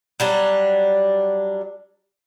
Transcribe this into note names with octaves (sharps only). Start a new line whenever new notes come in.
F#3 G3 D4